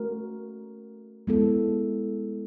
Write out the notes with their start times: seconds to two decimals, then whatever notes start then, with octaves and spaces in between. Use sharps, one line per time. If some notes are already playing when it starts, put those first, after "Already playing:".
Already playing: A3 C#4 F#4 A#4
1.27 G#3 B3 E4 A4